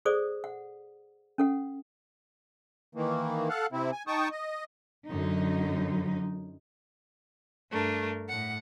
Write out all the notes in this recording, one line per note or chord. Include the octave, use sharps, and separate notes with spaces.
G#4 A4 C5 D5 D#6
F#5
C#4 A4 F#5
D#3 E3 A#3
A4 F5 F#5
C3 C4 E4
G#5
D#4 G5 A5 C#6 D#6
D#5
F#2 D3 D#4
G2 A3 D4 A#4
A2 F#5